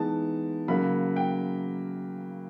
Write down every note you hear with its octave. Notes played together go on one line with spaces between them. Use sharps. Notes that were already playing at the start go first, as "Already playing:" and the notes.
Already playing: E3 G#3 B3 D#4 A5
C#3 F#3 A#3 B5
G5